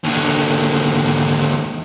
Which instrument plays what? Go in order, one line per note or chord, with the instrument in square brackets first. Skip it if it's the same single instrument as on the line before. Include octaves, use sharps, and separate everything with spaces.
[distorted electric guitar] D#2 D3